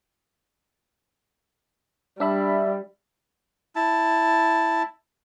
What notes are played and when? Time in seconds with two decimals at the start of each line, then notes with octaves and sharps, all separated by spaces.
2.20 G3 D4 E5 B5
3.76 E4 A5